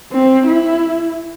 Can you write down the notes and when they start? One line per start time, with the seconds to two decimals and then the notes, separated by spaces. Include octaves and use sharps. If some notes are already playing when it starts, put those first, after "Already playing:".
0.12 C4
0.47 E4